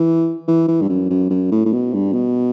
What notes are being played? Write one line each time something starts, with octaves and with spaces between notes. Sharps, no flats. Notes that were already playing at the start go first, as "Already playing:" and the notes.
Already playing: E3
E3
E3
G2
F#2
F#2
F#2
A2
A2
B2
G2
B2